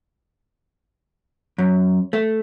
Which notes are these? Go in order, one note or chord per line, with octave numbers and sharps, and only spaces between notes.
F#2
A3